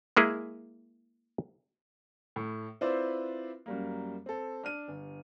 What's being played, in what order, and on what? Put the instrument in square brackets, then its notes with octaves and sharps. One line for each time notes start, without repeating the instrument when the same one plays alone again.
[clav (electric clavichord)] G#3 A#3 E4 G#4
[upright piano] A2
C4 E4 F4 B4 C5 D5
F#2 G3 A#3
C4 A4
D4 F6 D#7
G1